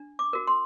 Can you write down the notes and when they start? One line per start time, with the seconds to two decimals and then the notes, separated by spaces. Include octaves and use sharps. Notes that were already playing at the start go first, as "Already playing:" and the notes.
Already playing: D4
0.19 D6
0.33 F#4 A#4
0.47 C6